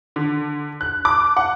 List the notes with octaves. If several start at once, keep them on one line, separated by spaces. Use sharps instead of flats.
D3
F#6
D6
F#5